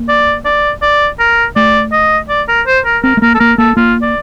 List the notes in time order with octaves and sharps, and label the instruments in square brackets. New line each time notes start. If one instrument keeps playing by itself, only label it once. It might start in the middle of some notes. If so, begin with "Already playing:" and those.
Already playing: [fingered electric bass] A#3
[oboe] D5
D5
D5
A#4
[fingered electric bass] A3 [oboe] D5
[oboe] D#5
D5
A#4
C5
A#4
[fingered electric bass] C4 [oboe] A#4
[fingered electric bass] A3
[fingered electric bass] A#3 [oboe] A#4
[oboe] A4
[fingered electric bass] A#3 [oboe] A#4
[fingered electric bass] A#3 [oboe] A4
[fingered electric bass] A#3 [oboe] F4
[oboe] D5